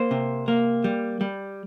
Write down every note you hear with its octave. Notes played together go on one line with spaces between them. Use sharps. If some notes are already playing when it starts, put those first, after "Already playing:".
Already playing: A#3 C5
C3
A#3
G3
G3